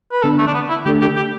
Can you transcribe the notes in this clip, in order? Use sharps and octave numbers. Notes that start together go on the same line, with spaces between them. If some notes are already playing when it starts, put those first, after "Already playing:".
B4
D3 B3 D4 A4
A3
D4
B3
E4
D3 A3 D4 G4 A4
G4
G4